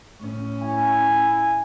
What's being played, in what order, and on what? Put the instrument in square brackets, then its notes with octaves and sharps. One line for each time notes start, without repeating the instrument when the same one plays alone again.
[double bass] A2 C#4
[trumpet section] E4 G#5